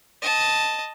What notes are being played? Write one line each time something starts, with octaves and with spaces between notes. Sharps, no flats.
D#5 A5